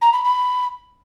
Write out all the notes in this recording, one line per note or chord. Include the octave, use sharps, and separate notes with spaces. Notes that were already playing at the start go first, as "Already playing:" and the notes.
A#5
B5
B5